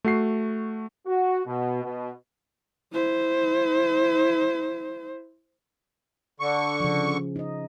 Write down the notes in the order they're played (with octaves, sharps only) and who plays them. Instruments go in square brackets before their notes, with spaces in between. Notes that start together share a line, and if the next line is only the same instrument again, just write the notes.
[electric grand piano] A3 F#4 C7
[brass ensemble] F#4
B2
B2
[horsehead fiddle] E4 C5
[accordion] D3 C#6
[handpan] C#3 F3
D#4 D#5